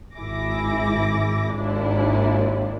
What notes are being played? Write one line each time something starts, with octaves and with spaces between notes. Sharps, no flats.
G#1 E4 G#4 D6 A#6
G#1 D#2 D4 E4 F4